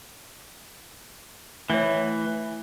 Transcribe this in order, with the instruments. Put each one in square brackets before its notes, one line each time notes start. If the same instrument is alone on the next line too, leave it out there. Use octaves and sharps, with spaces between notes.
[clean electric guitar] E3 [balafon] A3 C#5